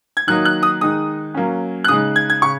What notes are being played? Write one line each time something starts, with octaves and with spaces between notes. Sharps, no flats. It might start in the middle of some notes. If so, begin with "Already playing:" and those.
G#6
D#3 F#3 A#3 D#4 F#6
F#6
D#6
D#3 G#3 D#4 D#6
F#3 A#3 C#4
F#6
C#3 G#3 D#4 D#6
G#6
G#6
C#3 C#6